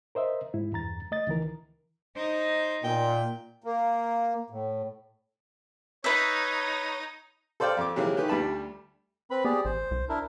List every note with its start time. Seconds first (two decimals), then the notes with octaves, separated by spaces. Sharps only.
0.15 A#4 C5 D#5 E5
0.54 G#2 E4
0.72 E2 G2 A#5 A6
1.11 A3 D#5 A6
1.27 C#2 D#3 E3 A#4
2.16 D#4 C5
2.84 A#2 G5
3.64 A#3
4.50 A2
6.04 D#4 B4 C#5 E5
7.60 A4 C5 D5 F5 G5
7.77 F2 D6
7.96 C3 E3 F#3 G#3 A#3
8.16 D#3 A3 G4 G#4 B4
8.28 D2 G3 A5 B5
9.31 C4 B4 B5
9.45 B3 G4 G#4 D5
9.65 A1 C5
9.91 C2
10.09 D4 E4 A#4